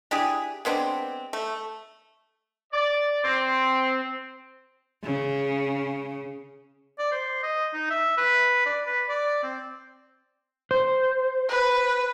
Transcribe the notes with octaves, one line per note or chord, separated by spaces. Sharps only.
D4 E4 G4 G#4
G#3 B3 C4 D4
A3
D5
C4
C#3
D5
C5
D#5
D#4
E5
B4
D5
B4
D5
C4
C5
B4